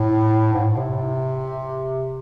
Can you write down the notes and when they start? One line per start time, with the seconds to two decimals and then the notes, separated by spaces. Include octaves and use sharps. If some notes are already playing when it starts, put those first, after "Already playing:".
Already playing: A2
0.53 G#2
0.64 A2
0.76 C3